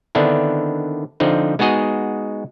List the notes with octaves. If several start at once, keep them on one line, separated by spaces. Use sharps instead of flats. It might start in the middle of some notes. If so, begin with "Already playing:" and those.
D3 D#3 B3 C4 D4 E4
D3 F3 C4 D#4
G#3 B3 D#4 F#4 G#4 D#5